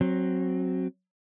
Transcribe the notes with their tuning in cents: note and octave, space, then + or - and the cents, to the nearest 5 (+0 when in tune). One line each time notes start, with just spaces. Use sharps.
F#3 +0 C4 +15